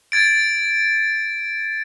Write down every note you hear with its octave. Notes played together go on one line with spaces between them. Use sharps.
G#6 A6 D7